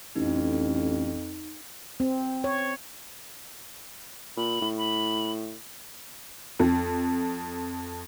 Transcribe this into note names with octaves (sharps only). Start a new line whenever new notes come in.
A1 F2 D#4
C4
C#5
A#2 B5
A2
B5
F2